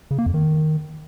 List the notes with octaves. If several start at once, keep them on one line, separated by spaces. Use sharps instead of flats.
C#3
A#3
F2
D#3